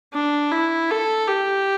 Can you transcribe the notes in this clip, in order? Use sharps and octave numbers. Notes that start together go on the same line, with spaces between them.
D4
E4
A4
G4